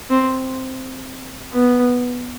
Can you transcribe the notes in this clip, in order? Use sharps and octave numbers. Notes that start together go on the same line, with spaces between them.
C4
B3